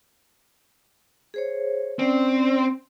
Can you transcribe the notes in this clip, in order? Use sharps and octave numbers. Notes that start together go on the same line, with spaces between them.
G#4 C5 C#5
C4 C#4 D5